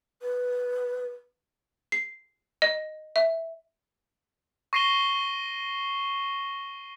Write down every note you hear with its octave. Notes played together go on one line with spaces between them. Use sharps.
B4
C7
D#5
E5
C#6 A#6 C7 D#7 E7 G7